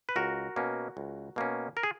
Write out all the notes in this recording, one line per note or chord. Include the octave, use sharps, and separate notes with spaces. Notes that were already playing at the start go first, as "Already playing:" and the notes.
B4
C#2 F#4 A#4
B2 A#3 C#4
C#2
B2 A#3 C#4
A#4
G#4